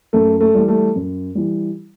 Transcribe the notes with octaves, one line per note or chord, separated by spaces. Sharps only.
F#2 A3
A3
E3 G3
A3
F#2
E3 G3